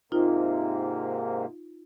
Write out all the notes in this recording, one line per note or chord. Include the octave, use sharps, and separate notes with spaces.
G#2 C3 A#3 D#4 F4